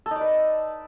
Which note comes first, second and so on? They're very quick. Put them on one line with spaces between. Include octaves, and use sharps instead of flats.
A4 D#4 D5 B4